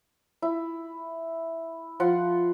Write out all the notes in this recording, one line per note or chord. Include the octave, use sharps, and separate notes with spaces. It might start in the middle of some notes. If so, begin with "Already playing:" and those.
E4
F3 F#5 C6